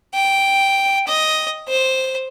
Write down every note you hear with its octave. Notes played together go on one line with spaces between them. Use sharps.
G5
D#5
C5